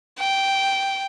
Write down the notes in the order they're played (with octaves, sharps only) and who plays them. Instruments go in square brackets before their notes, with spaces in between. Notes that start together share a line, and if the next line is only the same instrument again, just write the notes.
[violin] G5